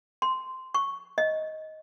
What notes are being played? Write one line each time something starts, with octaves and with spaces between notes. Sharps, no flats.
C6
C#6
D#5